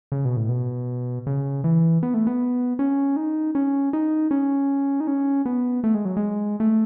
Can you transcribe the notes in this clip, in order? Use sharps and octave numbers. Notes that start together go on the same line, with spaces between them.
C#3
B2
A2
B2
C#3
E3
B3
A3
B3
C#4
D#4
C#4
D#4
C#4
D#4
C#4
B3
A3
G#3
F#3
G#3
A3